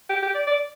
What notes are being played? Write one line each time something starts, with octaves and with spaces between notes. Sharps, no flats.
G4
G4
D5
D5